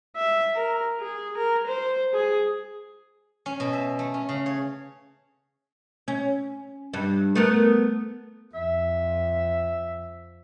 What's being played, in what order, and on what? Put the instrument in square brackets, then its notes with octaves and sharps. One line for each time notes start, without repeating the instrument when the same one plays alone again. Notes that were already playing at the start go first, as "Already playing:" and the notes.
[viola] E5
A#4
G#4
A#4
C5
G#4
[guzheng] C#4
B2
E5
A3
C#4
C#3
C#5
[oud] C#4
G2
A3 B3 A#4
[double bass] F2 [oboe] E5